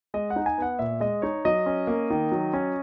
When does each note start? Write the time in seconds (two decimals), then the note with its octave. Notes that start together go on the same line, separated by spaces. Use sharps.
0.14 G#3 D#5
0.30 F#5
0.36 D#4
0.46 G#5
0.58 B3 F#5
0.79 A#2 E5
1.00 G#3 D#5
1.22 D#4 C#5
1.45 F#3 D#5
1.66 C#4
1.87 A#3
2.10 D#3
2.32 F#3
2.53 C#4